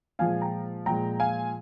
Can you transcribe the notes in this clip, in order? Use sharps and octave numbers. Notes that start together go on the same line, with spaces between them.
A#2 F3 G#3 F5 G#5
G5 A#5
A#2 F3 G#3 G5 A#5
F5 G#5